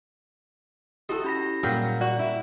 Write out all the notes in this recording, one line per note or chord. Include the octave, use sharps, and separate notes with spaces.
E4 F#4 G4 A4 D#5
C#4 B5 A#6
A#2 F#3 G3 A#3 G4 G#4
F#4 D5
E4